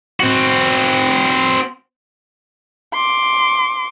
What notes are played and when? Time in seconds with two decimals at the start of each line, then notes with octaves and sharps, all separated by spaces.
0.20 C4 F#4
2.93 C6 D6